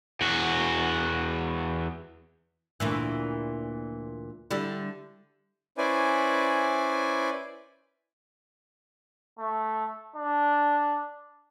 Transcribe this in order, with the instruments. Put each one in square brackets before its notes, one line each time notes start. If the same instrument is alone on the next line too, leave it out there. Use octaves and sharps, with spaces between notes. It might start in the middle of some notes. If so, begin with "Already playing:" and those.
[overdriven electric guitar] E2 F#4
[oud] D2 A#2 E3
D3 G3 E4
[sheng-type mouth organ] C#4 E4 B4 C5 D5 G#5
[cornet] A3
D4